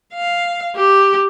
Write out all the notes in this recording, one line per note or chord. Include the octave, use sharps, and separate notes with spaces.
F5
G4